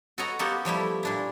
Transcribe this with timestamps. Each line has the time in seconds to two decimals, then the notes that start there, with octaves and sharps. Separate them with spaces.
0.18 F#4 A4 B4 C#5 D#5 A#5
0.39 A#3 B3 F#4 G4 A4
0.65 F3 G3 A3 E4
1.03 A#2 D4 E4